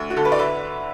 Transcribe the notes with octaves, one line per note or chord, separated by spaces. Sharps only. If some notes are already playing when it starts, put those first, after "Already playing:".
Already playing: D2 E5
F#4
D3 A4
B4
D5
B4 E5